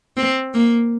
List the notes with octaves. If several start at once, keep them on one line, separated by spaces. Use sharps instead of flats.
C4
A#3